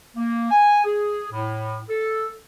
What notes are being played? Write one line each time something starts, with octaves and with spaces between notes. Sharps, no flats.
A#3
G#5
G#4
A2
A4